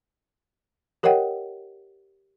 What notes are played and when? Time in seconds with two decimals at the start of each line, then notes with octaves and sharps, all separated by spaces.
1.03 G4 A#4 C#5 D#5 F#5 G5